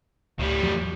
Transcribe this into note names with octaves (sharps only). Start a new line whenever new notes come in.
C#2 A2 G3
E2 F3 F#3